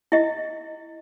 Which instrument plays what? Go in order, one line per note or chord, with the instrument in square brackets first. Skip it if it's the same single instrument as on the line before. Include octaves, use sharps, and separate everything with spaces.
[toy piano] E4 D#5